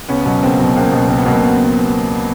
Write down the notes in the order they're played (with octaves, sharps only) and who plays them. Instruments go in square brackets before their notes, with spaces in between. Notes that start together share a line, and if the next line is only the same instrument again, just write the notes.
[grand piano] C#2 [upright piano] B3 C#4
[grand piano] B2 F#3
[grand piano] C#2 [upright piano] A#3 C4
[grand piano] B2 F#3
[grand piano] C#2 [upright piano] A#3 C4
[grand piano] B2 F#3
[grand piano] C#2 [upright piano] A#3 C4
[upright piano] B3
[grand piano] B2 F#3 [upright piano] A#3